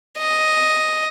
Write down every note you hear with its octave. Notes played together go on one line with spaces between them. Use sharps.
D#5